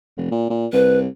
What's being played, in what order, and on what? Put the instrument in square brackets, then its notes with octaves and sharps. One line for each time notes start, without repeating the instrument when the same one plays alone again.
[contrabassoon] F1
A#2
A#2
[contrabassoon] C2 [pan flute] B4